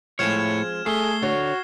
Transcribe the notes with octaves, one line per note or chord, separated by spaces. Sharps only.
A2 F3 G#3 C4 C#5 F6 G#6 E7
A3 G#4 A4 C7 G7
D3 F#4 C#5